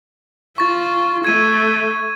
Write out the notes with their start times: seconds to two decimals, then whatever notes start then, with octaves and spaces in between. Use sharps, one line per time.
0.58 F4 C#6 A6
1.24 A3 G#6 D#7